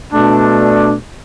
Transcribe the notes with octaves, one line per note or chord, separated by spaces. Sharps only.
B2 A3 D4